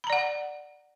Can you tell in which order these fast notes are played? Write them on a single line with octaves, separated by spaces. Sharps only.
B5 A#5 D5 F#5